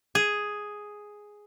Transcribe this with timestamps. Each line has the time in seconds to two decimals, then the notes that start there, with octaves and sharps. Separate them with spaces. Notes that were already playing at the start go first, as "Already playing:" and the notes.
0.15 G#4